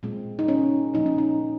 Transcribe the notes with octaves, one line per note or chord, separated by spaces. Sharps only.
A#2 G#3 C4
D#4
C#4
A#2 F3 A#3 C#4 D#4
C#4
D#4